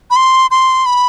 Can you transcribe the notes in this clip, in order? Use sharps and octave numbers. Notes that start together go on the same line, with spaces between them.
B5
C6
C6
B5